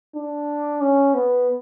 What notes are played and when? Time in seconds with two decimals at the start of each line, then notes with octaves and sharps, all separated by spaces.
0.15 D4
0.81 C#4
1.14 B3